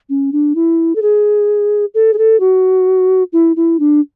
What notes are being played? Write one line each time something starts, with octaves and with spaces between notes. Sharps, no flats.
C#4
D4
E4
A4
G#4
A4
G#4
A4
F#4
E4
E4
D4